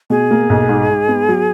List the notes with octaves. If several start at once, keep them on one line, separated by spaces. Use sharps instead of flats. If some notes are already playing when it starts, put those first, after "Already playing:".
B2 G#4
A#3
B1
G#2
G#2
B3
F#3